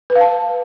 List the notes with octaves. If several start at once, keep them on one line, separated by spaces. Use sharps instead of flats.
B4
F5
A5